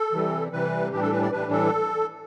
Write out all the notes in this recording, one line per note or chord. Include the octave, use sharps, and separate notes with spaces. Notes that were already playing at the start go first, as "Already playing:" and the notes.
Already playing: A4
C3 E3 G3
C3 E3 G3 B4
A2 E3 G3 D4 G4
A4
B4
D5
A2 E3 G3 D4 B4
A4